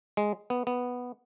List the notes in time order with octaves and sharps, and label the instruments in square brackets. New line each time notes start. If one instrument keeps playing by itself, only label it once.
[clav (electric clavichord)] G#3
B3
B3